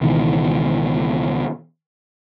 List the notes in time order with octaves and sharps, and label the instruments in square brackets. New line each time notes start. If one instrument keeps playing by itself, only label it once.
[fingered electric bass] C#2 B2 D#3 E3